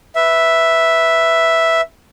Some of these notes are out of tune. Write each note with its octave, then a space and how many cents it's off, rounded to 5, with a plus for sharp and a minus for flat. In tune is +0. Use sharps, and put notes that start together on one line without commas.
B4 +0 E5 +0